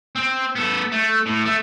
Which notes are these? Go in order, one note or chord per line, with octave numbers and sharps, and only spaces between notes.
C4
B3 A4
A3
A2
A3